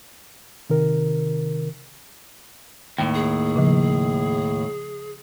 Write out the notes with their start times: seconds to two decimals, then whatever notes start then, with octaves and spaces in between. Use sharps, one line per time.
0.70 C3 D#3 A#4
2.98 D#2 A2 G5
3.15 G#4
3.56 C#3 F3